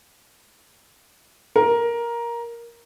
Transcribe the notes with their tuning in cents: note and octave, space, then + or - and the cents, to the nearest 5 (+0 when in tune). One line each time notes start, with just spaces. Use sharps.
A#4 +10